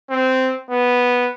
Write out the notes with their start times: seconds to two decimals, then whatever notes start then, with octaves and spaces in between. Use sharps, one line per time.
0.10 C4
0.70 B3